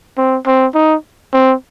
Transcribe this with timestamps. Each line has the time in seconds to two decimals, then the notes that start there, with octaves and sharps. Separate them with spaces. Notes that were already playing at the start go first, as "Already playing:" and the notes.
0.18 C4
0.46 C4
0.75 D#4
1.34 C4